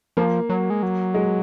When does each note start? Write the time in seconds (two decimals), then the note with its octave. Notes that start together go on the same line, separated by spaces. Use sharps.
0.17 F3 A#3
0.49 F#3
0.70 G#3
0.83 F#3
1.14 G#3